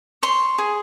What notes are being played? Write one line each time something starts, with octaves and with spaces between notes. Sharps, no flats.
C#5 C6
G#4